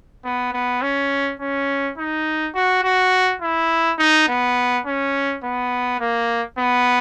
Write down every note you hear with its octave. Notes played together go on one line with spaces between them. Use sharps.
B3
B3
C#4
C#4
D#4
F#4
F#4
E4
D#4
B3
C#4
B3
A#3
B3